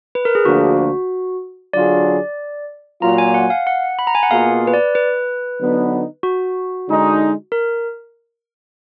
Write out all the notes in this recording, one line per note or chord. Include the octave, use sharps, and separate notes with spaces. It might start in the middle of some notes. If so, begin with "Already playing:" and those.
B4
A#4
G#4
D2 D3 F3 A#3 D4 F#4
D3 F#3 D4 F4 G#4 D5
A#2 F#3 A#3 F4 A#5
G#5
F#5
F5
F#5
B5
A#5
G#5
F#5
B2 A#3 F4 G#4 F5
B4
D5
B4
D3 F#3 B3 D#4
F#4
D3 G#3 D#4
A#4